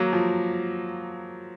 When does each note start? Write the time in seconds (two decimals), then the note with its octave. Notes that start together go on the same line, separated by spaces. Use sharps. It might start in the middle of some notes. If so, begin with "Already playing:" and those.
Already playing: F#3 A#3
0.13 F3